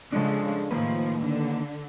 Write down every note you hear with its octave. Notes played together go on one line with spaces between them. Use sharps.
C#3 F3 G#3 D4 A4
A2 D#3 F3 A#3 B4
D3